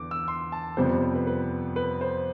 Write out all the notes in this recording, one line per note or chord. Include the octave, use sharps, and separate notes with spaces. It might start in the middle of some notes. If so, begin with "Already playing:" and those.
Already playing: E2 D3 D6
E6
C6
A5
F2 C3 G3 B3 C5
B4
C5
B4
B4
B4
C5